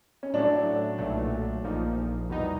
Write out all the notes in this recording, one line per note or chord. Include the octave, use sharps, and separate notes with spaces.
C#4
A2 F#3 A3 D4
B1 A#2 F#3 A3
A#1 A#2 F3 A#3 D#4
E2 B2 G3 B3 D#4